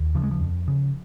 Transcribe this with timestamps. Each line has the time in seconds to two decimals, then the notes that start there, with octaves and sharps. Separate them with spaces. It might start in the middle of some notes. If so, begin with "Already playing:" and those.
Already playing: D#2
0.15 C#3 F3
0.23 G#3
0.31 F3
0.41 F2
0.68 C#3